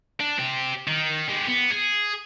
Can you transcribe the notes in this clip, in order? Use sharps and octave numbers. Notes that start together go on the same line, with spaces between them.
D4
C4 G4
D#3
G#3 G4
B3
G#4